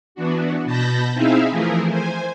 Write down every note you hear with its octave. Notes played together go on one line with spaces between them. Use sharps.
E3 B3 D4 F#4
B2 A5 B5 G6 A#6
C4 D#4 E4 G#4 E5 F5
E3 F3 A3 E4 G#4 A#4
C5 G#5